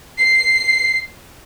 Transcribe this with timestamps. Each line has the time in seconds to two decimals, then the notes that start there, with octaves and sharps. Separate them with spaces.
0.18 C7